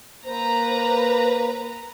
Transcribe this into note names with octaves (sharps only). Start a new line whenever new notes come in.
A#3 B4 C5 A#5